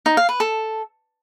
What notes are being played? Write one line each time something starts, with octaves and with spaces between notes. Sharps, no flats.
D#4
F5
B4
A4